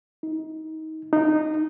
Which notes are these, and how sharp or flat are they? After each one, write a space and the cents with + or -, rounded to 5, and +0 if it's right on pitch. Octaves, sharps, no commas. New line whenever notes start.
D#4 +25
D#4 -15